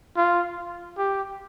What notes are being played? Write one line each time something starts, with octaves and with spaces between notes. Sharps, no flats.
F4
G4